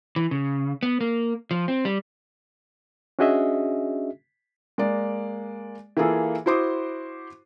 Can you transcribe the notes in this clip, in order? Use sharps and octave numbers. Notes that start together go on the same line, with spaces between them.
E3
C#3
B3
A#3
F3
C4
G3
C#4 D4 F#4 G#4 D#5 E5
G#3 A#3 D5
E3 A#3 F4 G#4 A4
E4 F#4 C5 C6 D6 D#6